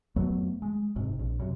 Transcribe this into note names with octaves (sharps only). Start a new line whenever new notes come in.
F2 F#3 A3 B3
G#3
F#1 G#2 C3
A#1
F#2 C3